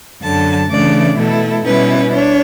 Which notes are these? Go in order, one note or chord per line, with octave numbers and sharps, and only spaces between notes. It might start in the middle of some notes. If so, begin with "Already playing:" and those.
F#2 D3 F#3 A5
C#3 E3 A3 D4 D5
B2 A3 E4 A4
B2 G3 C#4 E4 B4
D4 C#5